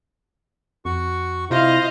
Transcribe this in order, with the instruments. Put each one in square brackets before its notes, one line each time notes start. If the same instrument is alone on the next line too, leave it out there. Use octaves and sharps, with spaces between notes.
[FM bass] F2 [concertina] F#4 C#6
[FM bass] C3 [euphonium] E4 [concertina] F4 C5 [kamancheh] D#5 F5